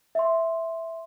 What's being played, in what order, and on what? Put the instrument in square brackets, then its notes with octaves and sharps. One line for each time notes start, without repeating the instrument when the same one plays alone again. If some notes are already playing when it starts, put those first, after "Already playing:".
[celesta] E5 C6